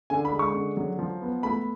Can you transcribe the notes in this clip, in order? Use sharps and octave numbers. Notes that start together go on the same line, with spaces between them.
D3 G#5
B5
G#3
C#6
D3
F#3
F3
B3
A3 B5